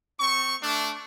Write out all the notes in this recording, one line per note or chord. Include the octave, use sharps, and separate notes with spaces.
C4 C#6
A3 D4